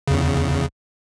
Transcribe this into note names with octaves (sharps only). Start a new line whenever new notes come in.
E2 C#3